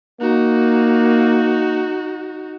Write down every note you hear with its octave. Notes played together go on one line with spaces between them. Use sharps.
A#3 D#4 F#4